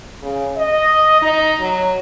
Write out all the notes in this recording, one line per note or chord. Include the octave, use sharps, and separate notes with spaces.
C#3
D#5
D#4
F#3